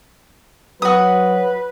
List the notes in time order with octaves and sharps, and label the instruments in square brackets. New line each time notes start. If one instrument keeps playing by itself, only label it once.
[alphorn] F#3 [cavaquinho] F#4 D#6 [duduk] B4